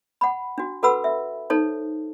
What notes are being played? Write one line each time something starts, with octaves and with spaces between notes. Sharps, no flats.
F#5 B5
D4 F#4
F#4 A4 B4 F#5 B5 E6
E5
D#4 A4 C5 C#5 A5